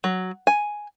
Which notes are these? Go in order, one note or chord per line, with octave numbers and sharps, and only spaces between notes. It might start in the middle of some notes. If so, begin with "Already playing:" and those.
F#3
G#5